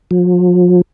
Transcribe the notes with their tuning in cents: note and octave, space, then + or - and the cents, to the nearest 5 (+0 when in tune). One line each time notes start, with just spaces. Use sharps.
F3 +40